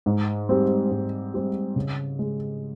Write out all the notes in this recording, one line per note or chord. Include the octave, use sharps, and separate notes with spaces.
G#2
G3 C4 G4
G#2
G3 C4 G4
C#3
G#3